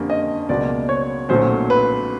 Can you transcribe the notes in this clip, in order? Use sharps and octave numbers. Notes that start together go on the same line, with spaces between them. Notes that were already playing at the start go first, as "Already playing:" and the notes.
Already playing: F2 D3 G3 A#3 C#4
D#5
C#2 B2 F#3 A#3 D5
C#5
B1 A#2 F#3 A3 C#4 C5
B4